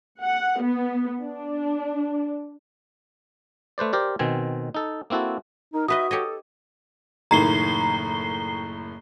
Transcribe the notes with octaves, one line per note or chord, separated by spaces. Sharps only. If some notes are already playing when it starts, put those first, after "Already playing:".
F#5
B3
D4
A3 B4 C5 D5
G4 A#4 C5 D5
B2 D#3 C4 G#5
D#4 A4
A#3 C4 E4 F#4 A4
D#4 A#4
D#4 F#4 B4 D#5 E5 D#6
G4 A4 C#5 D#5
F#1 A2 D#3 A#5 C7 G7